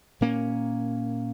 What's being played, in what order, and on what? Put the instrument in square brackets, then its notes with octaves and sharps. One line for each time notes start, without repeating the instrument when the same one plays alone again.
[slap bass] A#2 A#3 C#4